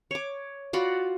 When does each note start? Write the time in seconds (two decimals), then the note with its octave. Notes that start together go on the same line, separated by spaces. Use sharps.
0.11 C#5 D6
0.73 F4 F#4 D5 B5